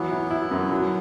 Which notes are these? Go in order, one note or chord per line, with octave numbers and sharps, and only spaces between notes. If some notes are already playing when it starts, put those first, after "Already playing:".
Already playing: E3 F#3 B3
E4
E4
F#2
F#3